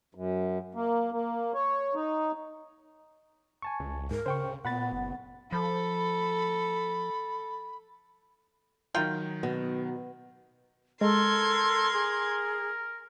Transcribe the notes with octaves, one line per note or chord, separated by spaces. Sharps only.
F#2
A#3
A#3
C#5
D#4
G#5 A5 C#6
C#2
G#2 A#4
C#3 C5 G5 C#6
A#2 B3 F#5 B5 A6
F#1
F3 A4 B5
D#3 F#3 D#4 F4 A#4 G5
B2
G#3 A4 A#4 C6 G#6
G#4